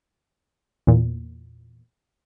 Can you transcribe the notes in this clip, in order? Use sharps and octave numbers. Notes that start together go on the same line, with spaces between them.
E2 A#2